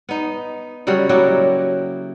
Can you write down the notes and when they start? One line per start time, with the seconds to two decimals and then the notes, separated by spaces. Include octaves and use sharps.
0.09 B3 D#4
0.87 C#3 F#3 G3 C#5
1.09 F#3 A#3 E4 G4